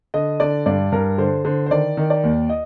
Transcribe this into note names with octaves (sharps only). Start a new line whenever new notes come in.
D3 D#5
D3 D5
G2 D5
G2 A#4
D3 C5
D3 C5
C5
D#3 D5
D#3
D5
D#2
D#5